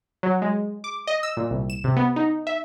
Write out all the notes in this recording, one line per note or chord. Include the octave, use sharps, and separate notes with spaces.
F#3
G#3
D6
D#5
E6
A#2
C2
E7
C3
B3
D#4
E5